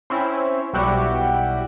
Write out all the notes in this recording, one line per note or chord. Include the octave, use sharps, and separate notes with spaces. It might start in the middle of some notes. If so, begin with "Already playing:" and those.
C4 C#4 E4
B1 G3 E4 F#4 G4